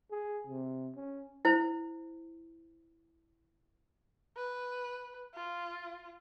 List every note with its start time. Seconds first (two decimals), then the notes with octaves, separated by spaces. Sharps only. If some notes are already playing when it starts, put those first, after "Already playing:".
0.11 G#4
0.47 C3
0.96 C#4
1.45 E4 C5
4.36 B4
5.34 F4